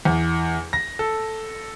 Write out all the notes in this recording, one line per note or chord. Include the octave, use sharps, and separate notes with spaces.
E2
A#6
A4